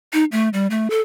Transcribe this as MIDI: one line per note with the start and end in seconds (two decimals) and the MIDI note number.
0.13 0.25 63
0.32 0.49 57
0.53 0.67 55
0.70 0.90 57
0.90 1.01 69